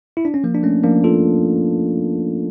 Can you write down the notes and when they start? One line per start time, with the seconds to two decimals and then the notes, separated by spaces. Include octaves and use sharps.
0.17 E4
0.25 D4
0.34 C#4
0.44 F3 A#3
0.55 D4
0.63 A3 C#4
0.83 F3 A#3 D4
1.04 F4 A4